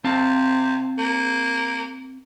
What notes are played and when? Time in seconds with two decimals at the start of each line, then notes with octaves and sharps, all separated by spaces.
0.04 C3 C4 F5 A5
0.98 A#3